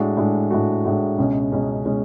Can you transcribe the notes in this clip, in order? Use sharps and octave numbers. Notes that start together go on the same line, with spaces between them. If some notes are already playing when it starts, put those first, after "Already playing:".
Already playing: A2 G#3 D4 F#4
A2 G#3 D4 F#4
A2 G#3 D4 F#4
A2 G#3 D4 F#4
C#2 B2 G#3 C#4
C#2 B2 G#3 C#4
B2 G#3 C#4